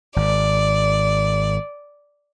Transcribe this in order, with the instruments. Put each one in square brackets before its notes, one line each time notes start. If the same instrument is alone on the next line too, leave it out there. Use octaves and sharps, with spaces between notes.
[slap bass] G#1 [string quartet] D5